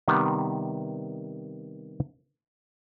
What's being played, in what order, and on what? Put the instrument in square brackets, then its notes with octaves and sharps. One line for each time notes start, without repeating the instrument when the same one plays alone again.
[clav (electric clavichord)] C3 D#3 G3 B3 G4 F#5